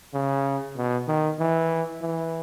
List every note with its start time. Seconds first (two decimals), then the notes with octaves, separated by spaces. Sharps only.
0.14 C#3
0.76 B2
1.08 D#3
1.39 E3
2.01 E3